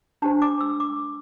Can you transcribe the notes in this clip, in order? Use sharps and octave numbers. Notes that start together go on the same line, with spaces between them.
D4 G4 C5 A5
D6
E6
D6